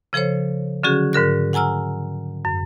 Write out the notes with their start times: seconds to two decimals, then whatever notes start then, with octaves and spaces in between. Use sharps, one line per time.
0.13 C#3 F3 A4 C5 C#5
0.83 D3 F#3 C#4 F#4 G#4
1.13 G#2 D3 A#4 F#6
1.53 F#5 G#5 A#5 E6 F6
2.45 F#2